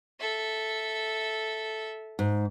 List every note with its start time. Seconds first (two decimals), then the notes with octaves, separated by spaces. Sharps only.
0.20 A4 E5
2.19 G#2